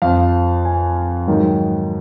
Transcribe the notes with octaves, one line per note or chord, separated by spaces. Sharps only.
F2 F3 F5
G#5
G#2 D#3 F#3